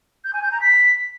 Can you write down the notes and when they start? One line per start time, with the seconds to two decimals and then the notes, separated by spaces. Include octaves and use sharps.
0.24 G6
0.33 G#5
0.42 G6
0.51 A#5
0.60 B6